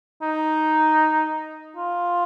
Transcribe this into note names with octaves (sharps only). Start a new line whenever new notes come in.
D#4
F4